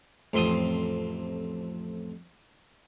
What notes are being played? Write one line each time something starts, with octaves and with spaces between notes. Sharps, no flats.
A1 F2 C4 C6 D#6